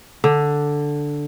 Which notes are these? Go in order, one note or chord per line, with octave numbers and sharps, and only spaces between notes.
D3